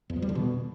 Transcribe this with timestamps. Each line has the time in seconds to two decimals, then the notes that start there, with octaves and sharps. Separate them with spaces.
0.10 E2
0.16 F3
0.22 G3
0.29 D3
0.35 B2